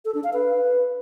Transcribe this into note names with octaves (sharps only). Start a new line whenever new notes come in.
A4
D4
F5
B4